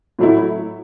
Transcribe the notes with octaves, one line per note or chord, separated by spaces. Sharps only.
A2 F#3 A3 E4